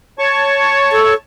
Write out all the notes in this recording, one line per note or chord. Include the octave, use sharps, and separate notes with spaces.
C#5 A5 C#6
A4